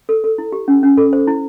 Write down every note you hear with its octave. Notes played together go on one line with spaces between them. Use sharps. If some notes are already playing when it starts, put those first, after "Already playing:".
A4
A4
E4
G4
C#4
C#4
A4
C5
E4